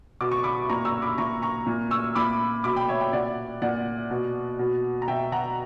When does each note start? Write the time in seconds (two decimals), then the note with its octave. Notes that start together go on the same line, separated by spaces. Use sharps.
0.21 B2 D6
0.32 C#6
0.43 B5 D6
0.69 A#2 A#5 C#6
0.85 C#6 E6
1.02 B5 D6
1.18 A#2 A#5 C#6
1.42 A#5 C#6
1.66 A#2
1.91 C#6 E6
2.15 A#2 B5 D6
2.64 B2 B5 D6
2.76 G5 B5
2.89 C#5 E5
3.00 E5 G5
3.13 A#2 D5 F#5
3.62 A#2 D5 F#5
4.10 B2
4.59 B2
5.02 A#5
5.08 B2 E5 G5
5.32 F#5 A#5